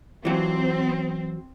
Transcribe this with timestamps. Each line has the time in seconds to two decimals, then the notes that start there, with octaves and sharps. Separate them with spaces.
0.25 E3 F#3 C4